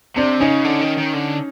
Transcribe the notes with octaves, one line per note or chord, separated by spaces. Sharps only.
C3 C4 D4
C#3 C#4 D#4
D3
D#3
D#3
D3